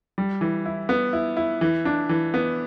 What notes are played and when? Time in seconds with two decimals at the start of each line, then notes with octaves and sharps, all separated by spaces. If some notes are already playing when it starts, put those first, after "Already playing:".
0.18 G3
0.41 E3
0.65 E4
0.89 B3
1.13 E4
1.37 E4
1.61 E3
1.85 D4
2.09 E3
2.34 B3